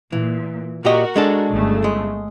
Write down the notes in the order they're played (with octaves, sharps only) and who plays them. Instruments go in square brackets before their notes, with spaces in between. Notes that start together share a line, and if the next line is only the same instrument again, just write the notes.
[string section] A#2 [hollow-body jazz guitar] E3
[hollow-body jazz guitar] A#2 G4 D#5 [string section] F#4 A#4
[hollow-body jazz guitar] G#3 D4 A4
[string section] G1 C#3 A3
[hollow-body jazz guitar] G#3